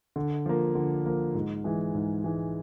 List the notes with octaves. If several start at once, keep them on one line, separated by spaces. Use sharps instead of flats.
D3
F3 A#3
D3
F3 A#3
G#2
E3 G#3
G#2
E3 G#3